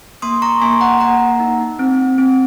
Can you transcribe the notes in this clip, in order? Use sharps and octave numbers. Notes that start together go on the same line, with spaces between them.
A#3 C6 D#6
A#5 C#6
A#3 G#5 C6
F#5 A#5
A#3 F#5 A#5
D#4
C4
C4